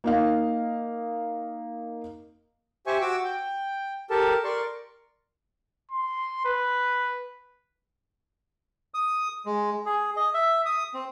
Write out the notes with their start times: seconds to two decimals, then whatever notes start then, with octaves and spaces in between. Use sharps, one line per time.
0.04 A#3 D#4 F5
2.87 G4 C5 E5 G#5 C#6
3.01 F#4 D6 E6
3.24 G5
4.10 G4 A4 A#4 A5
4.44 A#4 D5 C6 C#6
5.91 C6
6.45 B4
8.94 D#6
9.45 G#3
9.86 G#4
10.16 D#5
10.34 E5
10.66 D#6
10.94 C4